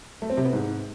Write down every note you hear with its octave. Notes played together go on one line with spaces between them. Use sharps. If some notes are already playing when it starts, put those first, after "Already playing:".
A3
C4
C3
B3
G#2